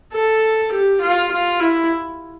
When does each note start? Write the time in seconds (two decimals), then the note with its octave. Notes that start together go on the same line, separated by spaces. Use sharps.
0.13 A4
0.72 G4
1.01 F4
1.31 F4
1.60 E4